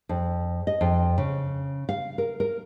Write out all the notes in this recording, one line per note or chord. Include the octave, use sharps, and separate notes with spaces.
F2
D#5
F2
C#3
F5
A#4
A#4